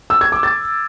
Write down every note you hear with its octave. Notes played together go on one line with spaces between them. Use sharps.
E6
G#6
D6
A6